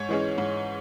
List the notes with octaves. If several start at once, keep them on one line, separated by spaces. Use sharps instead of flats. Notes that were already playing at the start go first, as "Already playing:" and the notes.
Already playing: G#2 C#5
E3 G#3 C#4
G#2